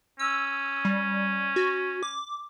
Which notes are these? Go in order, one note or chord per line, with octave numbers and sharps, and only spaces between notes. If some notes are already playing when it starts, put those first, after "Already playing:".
C#4 E6
G3
F#4
D6